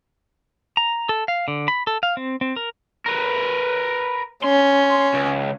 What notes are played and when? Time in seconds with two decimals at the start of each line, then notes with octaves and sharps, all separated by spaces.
0.77 A#5
1.09 A4
1.28 F5
1.48 D3
1.68 B5
1.87 A4
2.03 F5
2.17 C4
2.41 C4
2.56 A#4
3.06 A#4 B4
4.44 C#4 C6
5.14 C#2